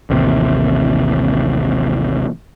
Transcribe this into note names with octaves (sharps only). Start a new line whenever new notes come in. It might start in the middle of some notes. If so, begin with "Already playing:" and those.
A1 D#2 C3